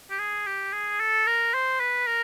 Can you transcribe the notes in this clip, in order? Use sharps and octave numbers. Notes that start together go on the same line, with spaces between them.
G4
G#4
G4
G#4
A4
A#4
C5
B4
A#4